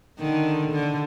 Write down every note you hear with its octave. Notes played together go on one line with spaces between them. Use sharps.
D3 D#3
D3